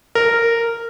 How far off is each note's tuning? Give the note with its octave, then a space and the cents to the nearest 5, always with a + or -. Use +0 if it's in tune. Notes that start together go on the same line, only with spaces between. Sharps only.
A#4 -10